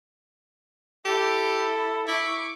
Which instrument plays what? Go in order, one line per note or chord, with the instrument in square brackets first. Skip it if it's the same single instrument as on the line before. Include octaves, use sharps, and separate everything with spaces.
[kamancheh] E4 A4 [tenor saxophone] G4
[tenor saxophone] E4 [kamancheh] C#6 D6